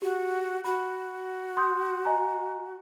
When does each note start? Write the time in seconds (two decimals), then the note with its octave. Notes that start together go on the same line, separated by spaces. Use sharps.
0.02 F#4 G4
0.64 F#4 B5
1.57 C6 D#6 G6
2.05 D#5 G#5 A#5